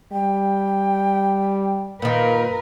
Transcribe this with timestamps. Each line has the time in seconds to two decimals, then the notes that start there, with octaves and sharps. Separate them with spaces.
0.12 G3 G5
2.02 A#2 D#3 A#4 B4